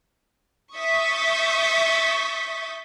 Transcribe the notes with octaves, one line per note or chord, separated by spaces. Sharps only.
E5 C#6 D#6 G6 A6 B6